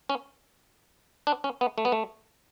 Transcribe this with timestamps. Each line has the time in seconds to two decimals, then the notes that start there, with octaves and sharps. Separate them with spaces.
0.09 C#4
1.27 D4
1.44 C#4
1.61 B3
1.78 A3
1.85 B3
1.92 A3